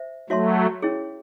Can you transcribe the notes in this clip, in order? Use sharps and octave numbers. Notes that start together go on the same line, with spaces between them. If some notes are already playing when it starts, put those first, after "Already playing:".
Already playing: C5 E5
F#3 A3 F#4 C#5 E5 A5 C6
C#4 E4 G#4 C#5